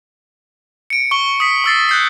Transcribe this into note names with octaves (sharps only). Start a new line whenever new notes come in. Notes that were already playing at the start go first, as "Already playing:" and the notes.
C#7 D7
C#6 G7
D#6 B6
C#6 E6 A6 C7
F#6 G6 C7